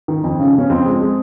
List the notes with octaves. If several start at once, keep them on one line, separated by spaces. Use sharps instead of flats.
D#3
F2
C#3
C#3 C#4
F2 C4
G#3
G#3